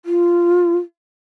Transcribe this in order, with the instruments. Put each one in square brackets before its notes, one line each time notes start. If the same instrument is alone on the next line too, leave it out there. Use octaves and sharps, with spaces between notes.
[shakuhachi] F4